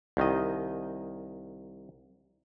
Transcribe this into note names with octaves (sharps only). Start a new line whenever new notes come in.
C2 D#3 D#5